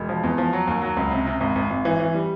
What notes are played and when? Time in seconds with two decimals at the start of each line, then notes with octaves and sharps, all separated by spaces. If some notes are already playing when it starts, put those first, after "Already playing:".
Already playing: E1
0.09 F3
0.23 E2
0.38 F3
0.53 F#3
0.67 D#2
0.82 F#3
0.97 C#2
1.11 C3
1.27 C3
1.40 G#1
1.55 G#1
1.71 G#1
1.85 E3
2.00 E3
2.14 G3